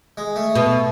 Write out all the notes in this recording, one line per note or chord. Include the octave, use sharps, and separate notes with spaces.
G#3
A3
B2